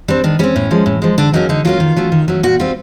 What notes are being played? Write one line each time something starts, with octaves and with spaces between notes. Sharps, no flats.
G3 C4 D4
D#3 D4
G3 C4 C#4
A2
F3 G#3
A2
F3 G#3
D3 D4
F#3 A#3 C#4 D#4
D3 D#4
F#3 A#3 C#4 F4
D#3
F#3 A3 C#4
D#3
F#3 A3 C#4
A#2 F#4
G3 C4 F4